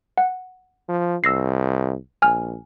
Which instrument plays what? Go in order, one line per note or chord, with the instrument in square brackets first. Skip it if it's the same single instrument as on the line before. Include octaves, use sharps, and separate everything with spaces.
[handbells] F#5
[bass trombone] F3
[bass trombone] C2 [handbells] E6 A#6 C7
[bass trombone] A#1 [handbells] G#5 F6